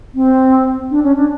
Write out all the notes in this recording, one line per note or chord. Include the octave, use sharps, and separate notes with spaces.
C4
D4
C#4
D4